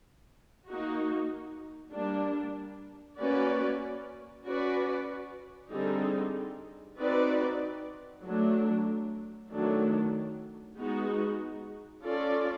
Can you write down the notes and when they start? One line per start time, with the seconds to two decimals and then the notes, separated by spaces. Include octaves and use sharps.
0.67 A#3 D#4 F#4
1.93 G3 A#3 D4
3.19 A#3 C#4 F#4 B4 D5
4.46 C#4 F#4 B4 D5
5.72 D3 G3 C4 D#4 G#4
6.99 C4 D#4 F#4 B4 D5
8.24 F#3 A3 D4
9.50 D#3 F#3 A3 D4
10.77 G#3 B3 D#4 F#4
12.03 C#4 F4 A4 D5